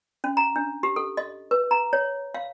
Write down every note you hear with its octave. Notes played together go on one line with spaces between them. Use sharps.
C#4
A#5
D4
G4
A4
D#5
B4
A#5
C#5
F5